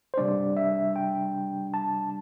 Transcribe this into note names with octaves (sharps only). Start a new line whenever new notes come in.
C5
C3 G3 D4 D5
E5
G5
A5